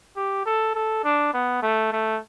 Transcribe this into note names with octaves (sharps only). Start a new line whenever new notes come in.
G4
A4
A4
D4
B3
A3
A3